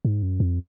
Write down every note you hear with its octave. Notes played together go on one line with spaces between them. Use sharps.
G#2
F#2
F2